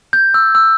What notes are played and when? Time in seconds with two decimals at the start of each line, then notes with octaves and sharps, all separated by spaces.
0.13 G6
0.34 E6
0.55 E6